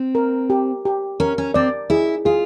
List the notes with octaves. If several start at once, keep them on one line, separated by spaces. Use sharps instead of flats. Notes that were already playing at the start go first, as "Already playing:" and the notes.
Already playing: C4
A#4
G4
G4
C#4 A#4
C#4
C4 D5
E4 G#4
F4 G#4